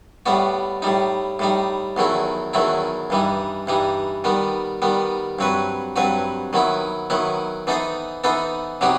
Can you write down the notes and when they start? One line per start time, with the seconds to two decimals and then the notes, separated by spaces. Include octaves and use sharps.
0.26 A2 G3 B3 F#4
0.82 A2 G3 D#4
1.39 A2 G3 D#4
1.96 E2 D#3 F#3 A3 E4
2.53 E2 D#3 F#3 A3 E4
3.10 G2 E3 G3 D#4
3.67 G2 E3 G3 D#4
4.24 D#3 G3 B3
4.82 D#3 G3 B3
5.39 G2 F#3 C4 F#4 B4
5.96 G2 F#3 C4 F#4 B4
6.53 D#3 F#3 B3 E4
7.10 D#3 F#3 B3 E4
7.67 E3 B3 D#4 A4 C5
8.24 E3 B3 D#4 A4 C5
8.81 C3 F#3 B3 D#4 G4